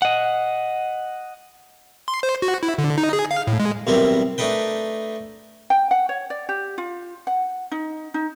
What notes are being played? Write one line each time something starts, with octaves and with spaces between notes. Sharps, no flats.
D#5 F#5
C6
C5
F#4
E4
D3
D#4
G#4
F5
A2
G#3
B1 D#3 G3 C4 E4 A#4
A3 D4 D#4 B4 G5
G5
F#5
C#5
D5
G4
F4
F#5
D#4
D#4